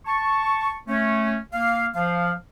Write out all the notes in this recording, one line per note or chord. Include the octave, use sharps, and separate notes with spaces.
A5 C#6
A3 C#4
A#3 F5
F3 F5